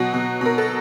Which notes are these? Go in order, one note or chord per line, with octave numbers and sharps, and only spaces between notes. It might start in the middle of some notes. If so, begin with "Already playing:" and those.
Already playing: B2 F#3 F#4
B2
B2 A#4
A4